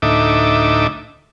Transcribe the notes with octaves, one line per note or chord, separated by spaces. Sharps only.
D2 A2 D#4 E5 D6